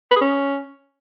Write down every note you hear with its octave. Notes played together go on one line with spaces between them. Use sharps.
B4
G#4
C#4